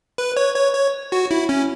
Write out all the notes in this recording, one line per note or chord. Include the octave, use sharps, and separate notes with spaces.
B4
C#5
C#5
C#5
F#4
E4
C#4